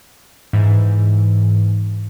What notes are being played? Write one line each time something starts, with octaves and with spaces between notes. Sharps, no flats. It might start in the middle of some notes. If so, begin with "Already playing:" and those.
G#2 E3